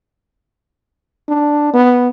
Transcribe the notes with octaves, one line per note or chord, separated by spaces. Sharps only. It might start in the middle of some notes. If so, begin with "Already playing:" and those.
D4
B3